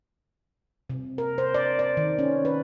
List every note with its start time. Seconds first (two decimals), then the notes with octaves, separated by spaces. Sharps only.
0.90 C3
1.18 A#4
1.38 C5
1.55 D5
1.79 D5
1.97 D#3
2.19 C#4
2.45 B4